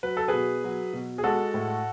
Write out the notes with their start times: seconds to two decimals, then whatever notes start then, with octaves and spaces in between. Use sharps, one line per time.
0.03 F#3 B4
0.17 A4
0.28 G#4 B4
0.33 B2
0.64 F#3
0.93 B2
1.18 G#4
1.24 G#3 F#4 A4
1.54 A2